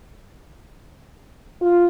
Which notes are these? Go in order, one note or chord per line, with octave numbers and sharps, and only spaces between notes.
F4